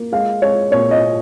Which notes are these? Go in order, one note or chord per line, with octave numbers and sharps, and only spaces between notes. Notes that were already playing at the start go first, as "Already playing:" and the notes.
Already playing: A#3
G#3 F5
G#3 C#5
A#2 C#5
D#5